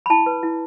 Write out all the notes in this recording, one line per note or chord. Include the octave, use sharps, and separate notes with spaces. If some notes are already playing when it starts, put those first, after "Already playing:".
B5
E4 A5
B4
E4